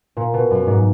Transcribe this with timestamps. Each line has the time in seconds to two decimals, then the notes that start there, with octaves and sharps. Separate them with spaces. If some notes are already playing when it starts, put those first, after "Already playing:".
0.17 A#2
0.34 B2
0.51 F#2
0.67 G#2